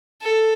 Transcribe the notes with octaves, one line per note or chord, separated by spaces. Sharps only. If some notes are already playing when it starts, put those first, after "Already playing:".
A4